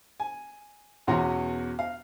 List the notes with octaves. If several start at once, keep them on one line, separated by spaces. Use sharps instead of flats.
G#5
E2 B2 C#4 F#4 A#5 C6
F5